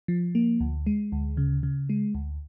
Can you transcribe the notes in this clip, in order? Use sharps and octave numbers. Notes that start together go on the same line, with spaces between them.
F3
A#3
D2
G#3
D2
C#3
C#3
G#3
D2